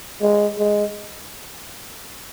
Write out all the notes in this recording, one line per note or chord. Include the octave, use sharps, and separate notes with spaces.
G#3
G#3